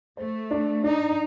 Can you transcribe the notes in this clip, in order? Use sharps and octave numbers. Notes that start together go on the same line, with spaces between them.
A3 C5
D4
D4 D#4